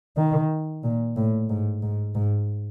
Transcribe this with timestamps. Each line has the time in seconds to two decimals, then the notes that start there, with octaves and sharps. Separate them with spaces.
0.17 D#3
0.84 A#2
1.16 A2
1.49 G#2
1.83 G#2
2.15 G#2